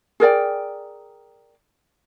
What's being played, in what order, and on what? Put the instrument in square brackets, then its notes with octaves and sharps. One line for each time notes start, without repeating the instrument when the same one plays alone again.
[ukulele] G#4 A#4 D5 G5